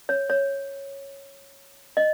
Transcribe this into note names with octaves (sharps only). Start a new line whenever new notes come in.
C#5
C#5
D#5